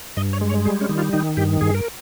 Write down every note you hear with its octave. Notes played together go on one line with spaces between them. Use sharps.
G2 D#5
C#5
G#3
C#5
G3 G#4
C#4
D#3
F4
D#3 D#4
G2 G4
G2 G#4
A#4